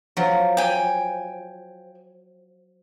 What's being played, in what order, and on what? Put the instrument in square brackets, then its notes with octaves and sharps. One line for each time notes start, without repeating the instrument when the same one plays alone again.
[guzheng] F3 F#3
[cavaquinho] G5 G#5